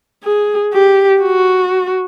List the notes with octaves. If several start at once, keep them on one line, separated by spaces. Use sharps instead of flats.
G#4
G4
F#4